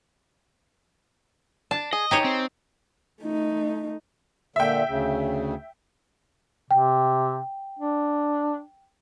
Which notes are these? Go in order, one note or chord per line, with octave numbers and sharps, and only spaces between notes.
D4 A5
G#4 D#5
D#4 G4 G#4 C#5
C4
A3 D#4
A#2 D3 E5 G5
D2 C#3
C3 G5
D4